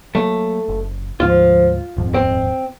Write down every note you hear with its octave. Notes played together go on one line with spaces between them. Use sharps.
F#3 A3 A#3
F#1
D2 G#2 F3 F4
D#1 F2 G#2 F3
C4